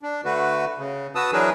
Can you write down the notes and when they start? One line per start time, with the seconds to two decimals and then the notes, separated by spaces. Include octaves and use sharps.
0.03 D4
0.25 D3 A3 F#4 B4
0.78 C#3
1.15 F#4 B4 A5 D#6 E6
1.33 E3 F#3 D4 G#4 A#4 B4